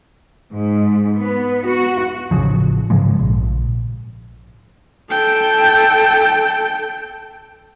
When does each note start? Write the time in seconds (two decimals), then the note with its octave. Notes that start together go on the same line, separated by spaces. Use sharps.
0.52 G#2
1.17 B3
1.66 F#4
2.31 A1 A2 C#3 F3
2.90 G#2 C#3 F3 G#3
3.19 A#1
5.11 A4 G5